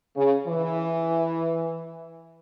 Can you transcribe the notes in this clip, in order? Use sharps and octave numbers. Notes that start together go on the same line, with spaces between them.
C#3
E3